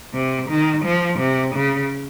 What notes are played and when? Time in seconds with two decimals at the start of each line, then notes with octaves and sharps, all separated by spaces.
0.14 C3
0.49 D#3
0.85 F3
1.19 C3
1.55 C#3